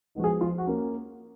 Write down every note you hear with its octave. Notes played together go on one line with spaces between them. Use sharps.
F3 G#3 B3 D#4 F#4
G#4
F3 F4
F#4
A#3 C#4